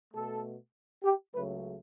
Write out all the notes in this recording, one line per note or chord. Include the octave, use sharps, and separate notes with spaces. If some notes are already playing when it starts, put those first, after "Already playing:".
B2 A3 A4
G4
C#2 C#3 F#3 A3 B4